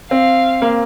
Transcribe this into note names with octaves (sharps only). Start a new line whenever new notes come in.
C4 F5
A#3